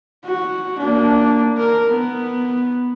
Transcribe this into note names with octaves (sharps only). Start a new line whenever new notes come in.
F#4
A#3 D4
A#4
B3